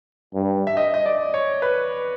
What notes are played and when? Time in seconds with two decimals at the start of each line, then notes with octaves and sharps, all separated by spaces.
0.35 G2
0.67 E5
0.77 D#5
0.94 D#5
1.06 D5
1.34 C#5
1.62 B4